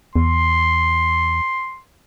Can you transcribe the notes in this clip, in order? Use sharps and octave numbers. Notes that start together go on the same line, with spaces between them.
E2 C6